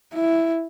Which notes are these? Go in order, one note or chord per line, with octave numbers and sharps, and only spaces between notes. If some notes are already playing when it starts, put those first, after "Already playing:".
E4